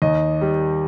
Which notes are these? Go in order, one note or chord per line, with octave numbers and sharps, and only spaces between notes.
D#2 D#5
G3